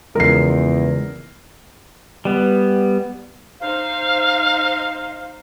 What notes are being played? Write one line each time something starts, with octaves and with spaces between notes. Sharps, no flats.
E2 C#3 F3 G#3 A#4 C7
G3 B3
D#4 C5 F5